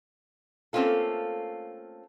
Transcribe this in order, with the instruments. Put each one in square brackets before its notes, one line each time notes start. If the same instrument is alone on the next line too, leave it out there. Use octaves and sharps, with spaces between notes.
[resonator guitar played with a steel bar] A3 A#3 C4 C#4 F4 A4